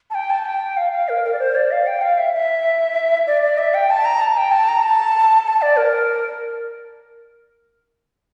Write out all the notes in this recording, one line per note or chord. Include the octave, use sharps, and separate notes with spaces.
A5
G5
A5
G5
F5
F5
A#4
A#4
D5
C5
D5
F5
G5
F5
E5
E5
D5
D5
E5
G5
A5
A#5
A5
G5
A5
A#5
A5
A5
D5
A#4